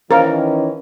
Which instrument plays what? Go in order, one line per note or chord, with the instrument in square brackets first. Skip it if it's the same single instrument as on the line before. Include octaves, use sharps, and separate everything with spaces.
[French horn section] D#3 E3 C#4 [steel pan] A#4 [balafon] C5 F5